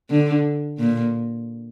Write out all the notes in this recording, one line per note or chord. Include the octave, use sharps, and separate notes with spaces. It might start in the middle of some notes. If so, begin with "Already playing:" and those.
D3
A#2